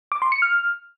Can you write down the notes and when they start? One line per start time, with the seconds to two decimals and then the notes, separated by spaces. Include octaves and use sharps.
0.12 D6
0.22 C6
0.32 C#7
0.42 F6